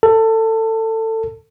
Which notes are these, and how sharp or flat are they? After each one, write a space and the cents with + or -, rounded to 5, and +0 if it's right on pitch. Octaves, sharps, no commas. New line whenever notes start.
A4 +20